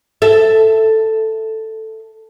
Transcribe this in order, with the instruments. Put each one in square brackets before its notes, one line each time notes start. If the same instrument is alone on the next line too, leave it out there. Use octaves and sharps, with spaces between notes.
[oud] A4 E5